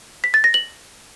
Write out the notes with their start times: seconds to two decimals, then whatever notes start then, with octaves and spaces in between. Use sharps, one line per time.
0.24 B6
0.34 A6
0.44 A#6
0.54 F#7